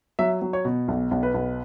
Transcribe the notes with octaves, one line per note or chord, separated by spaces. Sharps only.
F#3 E5
F#3
C#5
B2
B1
B1
B4
B1